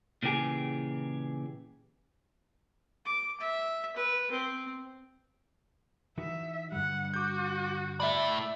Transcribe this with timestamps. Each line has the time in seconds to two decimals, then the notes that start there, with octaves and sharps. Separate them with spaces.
0.23 A#2 C#3 E3 G4 G#4
3.05 D6
3.40 E5
3.96 B4
4.31 C4
6.18 E3 D#4 F#4 E5
6.72 G2 D3 G3 F#5
7.14 F#4 D6 G6
8.00 A2 D5 E5 B5